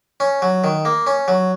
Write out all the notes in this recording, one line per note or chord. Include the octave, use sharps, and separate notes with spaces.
C#4
F#3
D#3
A#3
C#4
F#3